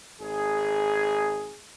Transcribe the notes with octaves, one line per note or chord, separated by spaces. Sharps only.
G#1 G#4